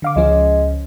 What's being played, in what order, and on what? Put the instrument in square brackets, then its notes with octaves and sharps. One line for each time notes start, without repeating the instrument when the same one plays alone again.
[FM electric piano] D3 F5 D6
[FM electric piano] C#2 F3 C#4 [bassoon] G#3